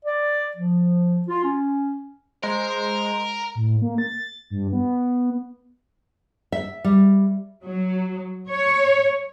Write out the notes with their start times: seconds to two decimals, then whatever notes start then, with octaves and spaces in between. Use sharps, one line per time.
0.04 D5
0.57 F3
1.28 F4
1.43 C#4
2.43 G#3 A#4 C5
3.55 A2
3.82 A#3
3.98 A6
4.50 G2
4.73 B3
6.52 E5
6.84 G3
7.63 F#3
8.48 C#5